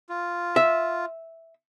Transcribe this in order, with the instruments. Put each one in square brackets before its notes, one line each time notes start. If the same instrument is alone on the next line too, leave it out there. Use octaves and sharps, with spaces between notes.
[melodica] F4
[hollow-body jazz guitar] E5